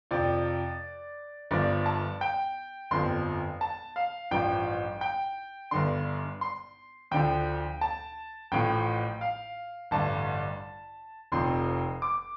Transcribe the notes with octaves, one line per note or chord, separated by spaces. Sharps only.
F2 C3 F3 D5
G1 G2 F3 D5
A5
G5
G1 F2 F3 C6
A5
F5
A1 G2 F3 G5
G5
G1 G2 D3 C6
C6
D2 D3 F3 G5
A5
A1 A2 F3 G5
F5
A1 G2 D3 A5
F1 F2 C3 F3 C6
D6